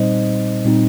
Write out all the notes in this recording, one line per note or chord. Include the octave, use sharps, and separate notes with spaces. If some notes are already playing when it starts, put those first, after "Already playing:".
Already playing: A#2 G3 C4 D#4 C5 D#5
A#2 G3 C4 D#4